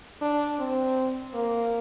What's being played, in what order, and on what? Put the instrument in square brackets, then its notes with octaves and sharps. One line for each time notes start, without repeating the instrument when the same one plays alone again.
[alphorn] D4
C4
A#3